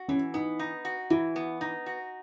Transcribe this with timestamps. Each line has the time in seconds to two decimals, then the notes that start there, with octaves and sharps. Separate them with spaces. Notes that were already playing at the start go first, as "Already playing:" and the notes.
Already playing: F#4
0.08 E3 C#4
0.34 B3 D#4
0.59 D#4
0.85 F#4
1.10 E3 E4
1.36 B3
1.61 D#4
1.86 F#4